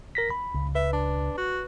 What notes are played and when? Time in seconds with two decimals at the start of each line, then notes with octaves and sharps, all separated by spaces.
0.15 A#4 A#6 B6
0.30 B5
0.54 C#2
0.75 B4 E5
0.93 D4
1.38 F#4